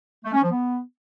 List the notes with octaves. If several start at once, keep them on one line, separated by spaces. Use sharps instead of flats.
A3
C#4
F3
B3